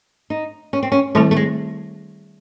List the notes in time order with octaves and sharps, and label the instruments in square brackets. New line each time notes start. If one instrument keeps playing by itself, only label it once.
[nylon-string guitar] D#4
C#4
C4
C#4
[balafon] D#3 G3 C4 E4 A4 [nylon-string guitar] A3
[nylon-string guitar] A3
G#3